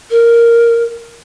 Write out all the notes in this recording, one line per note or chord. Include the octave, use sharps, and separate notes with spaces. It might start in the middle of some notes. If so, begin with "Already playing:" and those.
A#4